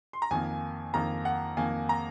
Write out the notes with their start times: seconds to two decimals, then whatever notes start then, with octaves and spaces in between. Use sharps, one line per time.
0.13 C6
0.22 A#5
0.31 F2 D#3 A#3 G#5
0.94 F2 D#3 A#3 A#5
1.25 F#5
1.57 F2 D#3 A#3 G#5
1.89 A#5